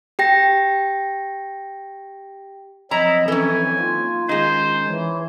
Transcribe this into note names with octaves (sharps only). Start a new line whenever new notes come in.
G4 G5 A#6
F3 F#3 C4 E4 D#5 A#5
E3 C#4 A4 G#5
A#3 D#4 F4
D#3 G#3 C#4 D#4 G#4 C5
E3 C#5